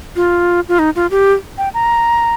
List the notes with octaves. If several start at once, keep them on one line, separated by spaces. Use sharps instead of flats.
F4
F4
D#4
F4
G4
G5
A#5